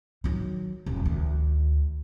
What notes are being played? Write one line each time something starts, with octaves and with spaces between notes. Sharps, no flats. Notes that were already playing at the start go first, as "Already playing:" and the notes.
D#3 F#3
D#1
D2 D#3